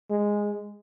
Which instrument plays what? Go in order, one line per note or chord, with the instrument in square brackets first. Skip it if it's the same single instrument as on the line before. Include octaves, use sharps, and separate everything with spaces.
[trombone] G#3